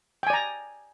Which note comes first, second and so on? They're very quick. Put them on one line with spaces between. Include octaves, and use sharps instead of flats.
G5 G#5 D5 A#5